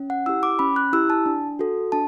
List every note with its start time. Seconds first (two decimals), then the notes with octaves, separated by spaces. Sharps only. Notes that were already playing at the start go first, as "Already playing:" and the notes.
Already playing: C#4
0.10 F#5
0.26 E4 G4 E6
0.43 D6
0.59 C#4 B5
0.76 F#6
0.93 E4 G4 E6
1.10 A5
1.26 D4
1.59 F#4 A4
1.92 D4 A5